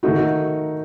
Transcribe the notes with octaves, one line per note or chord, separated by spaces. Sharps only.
D#3 A3 D#4 F#4